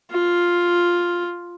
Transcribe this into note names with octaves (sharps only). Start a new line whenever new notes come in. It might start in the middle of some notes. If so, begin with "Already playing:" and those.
F4